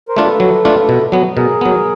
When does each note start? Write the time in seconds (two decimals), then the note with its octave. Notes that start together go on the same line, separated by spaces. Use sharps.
0.08 A#4 C5
0.16 A3 D4 F4
0.24 A4 B4
0.40 F#3
0.65 A3 D4 F4
0.89 B2
1.12 F#3 B3
1.36 B2 G#4 A#4
1.61 F#3 B3